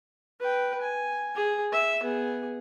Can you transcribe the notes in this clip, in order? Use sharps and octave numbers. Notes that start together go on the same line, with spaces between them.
B4 G5
G#5
G#4
E5
B3 G#4